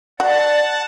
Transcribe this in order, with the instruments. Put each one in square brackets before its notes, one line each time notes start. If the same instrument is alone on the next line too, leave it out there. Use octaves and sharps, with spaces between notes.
[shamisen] F#4 [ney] D5 [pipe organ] F#5 A5